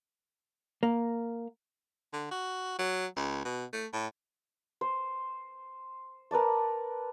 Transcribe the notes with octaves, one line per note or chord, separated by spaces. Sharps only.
A#3
D3
F#4
F#3
C#2
B2
A3
A2
C5
A#4 B4 D5 A5